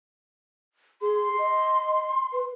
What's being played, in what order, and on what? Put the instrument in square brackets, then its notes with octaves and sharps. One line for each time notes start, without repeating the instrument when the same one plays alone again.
[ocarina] G#4 [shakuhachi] C6
[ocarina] D#5
B4